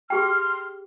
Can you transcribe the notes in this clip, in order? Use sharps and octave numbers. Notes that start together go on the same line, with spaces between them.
G4 G#4 G5 C6 F6